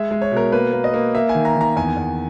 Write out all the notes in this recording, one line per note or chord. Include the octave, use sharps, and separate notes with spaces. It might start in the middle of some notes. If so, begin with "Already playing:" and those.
Already playing: G#3 E5
G#3
C#5
B2 A#4
A#3 B4
A#3
D#5
A#3
A#3 E5
G#5
D#3
A#5
D#3 A#5
E2 G#5
E2